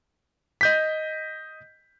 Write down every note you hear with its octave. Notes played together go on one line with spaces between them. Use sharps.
D#5 G6 B6